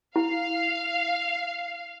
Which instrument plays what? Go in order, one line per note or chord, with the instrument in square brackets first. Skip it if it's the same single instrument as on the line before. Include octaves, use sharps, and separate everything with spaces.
[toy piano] E4 [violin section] F5